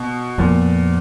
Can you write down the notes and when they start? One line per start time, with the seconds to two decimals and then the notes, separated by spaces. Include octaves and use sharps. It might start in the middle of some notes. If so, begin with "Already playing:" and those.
Already playing: B2
0.38 F2 A#2 F3 B3